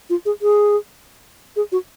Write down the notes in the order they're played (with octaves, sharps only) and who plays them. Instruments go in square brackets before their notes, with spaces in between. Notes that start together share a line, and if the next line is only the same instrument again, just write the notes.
[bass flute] F4
G#4
G#4
G#4
F#4